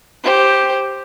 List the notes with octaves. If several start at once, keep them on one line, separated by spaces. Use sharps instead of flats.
G4 C5